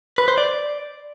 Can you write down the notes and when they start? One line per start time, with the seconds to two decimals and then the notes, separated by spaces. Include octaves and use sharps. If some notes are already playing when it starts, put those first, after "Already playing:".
0.18 B4
0.28 C5
0.38 D5